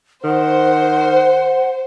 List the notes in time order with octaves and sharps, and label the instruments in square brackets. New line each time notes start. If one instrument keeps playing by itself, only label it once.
[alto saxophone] D#3 [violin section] C5 [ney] F#5